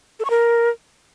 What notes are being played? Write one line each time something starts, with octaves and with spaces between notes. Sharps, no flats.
A4
C#6
A#4